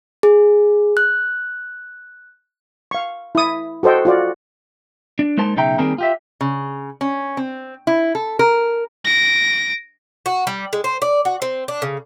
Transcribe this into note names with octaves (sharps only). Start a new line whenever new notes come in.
G#4
F#6
F5 C#6
E4 D#6
F#4 A4 C5 D#5 G5
F4 F#4 D5
D4
G#3 A#3 D#4 C5 A5
B1 C#3 D#4 E5 G5 A#5
D#3 G3 A#3 C4 G#4 A#4
F4 G4 E5
C#3
C#4
C4
E4
A4
A#4
A#6 D7
F#4
G3
G#3
C5
D5
F#4
C4
D4
C#3